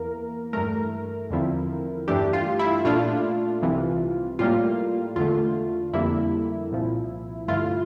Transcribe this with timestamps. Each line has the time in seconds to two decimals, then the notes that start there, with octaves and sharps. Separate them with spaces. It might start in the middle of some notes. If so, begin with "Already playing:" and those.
Already playing: E2 E3 A#3 A#4
0.53 G2 E3 A3 A#4
1.30 E2 D3 F3 C4 E4
2.08 G2 E3 A3 D4 G4
2.33 F4
2.59 E4
2.85 A#2 A3 D4 F4
3.62 C2 C3 E3
4.39 A2 G3 A#3 F4
5.16 E2 D3 A3 F4
5.93 F2 D3 G3 A#3 E4
6.71 C2 A#2 F3
7.48 G2 D3 A3 E4 F4